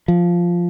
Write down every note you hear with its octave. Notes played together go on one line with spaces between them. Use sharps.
F3